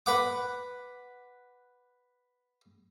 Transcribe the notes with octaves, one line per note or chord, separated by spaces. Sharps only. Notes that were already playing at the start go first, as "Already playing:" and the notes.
B4 F#5 D6